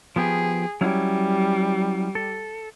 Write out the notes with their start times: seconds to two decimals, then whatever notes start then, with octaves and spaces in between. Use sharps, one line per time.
0.16 F3 B3 G4 G#4
0.81 F#3 G3 C#4 E4
2.15 A4